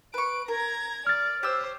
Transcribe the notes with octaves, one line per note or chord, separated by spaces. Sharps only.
B4 C#6 D7
A#4 A#5 G#6
D5 F6 A6
G4 C5 C#5 E6